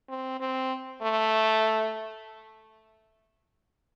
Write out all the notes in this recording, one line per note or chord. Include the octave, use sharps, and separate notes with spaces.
C4
C4
A3